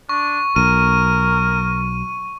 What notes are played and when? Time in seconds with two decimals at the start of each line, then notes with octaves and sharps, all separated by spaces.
0.09 D4 C#6
0.56 B1 A#4 D#7